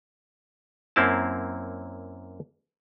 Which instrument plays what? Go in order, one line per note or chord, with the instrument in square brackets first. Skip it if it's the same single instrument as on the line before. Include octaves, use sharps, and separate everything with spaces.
[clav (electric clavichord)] F#2 A#3 C4 E4 A5